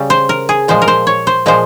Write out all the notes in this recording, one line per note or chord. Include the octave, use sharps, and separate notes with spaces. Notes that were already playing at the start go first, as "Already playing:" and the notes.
Already playing: C#3 G3
C5
A#4
G#4
A#2 F3 G#3 C5
A#4
C5
C#5
C5
A#2 F3 G#3 C5